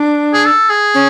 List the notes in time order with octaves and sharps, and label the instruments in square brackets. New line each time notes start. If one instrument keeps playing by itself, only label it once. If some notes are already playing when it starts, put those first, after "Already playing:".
Already playing: [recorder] D4
[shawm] G#4
A4
G#4
[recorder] C#4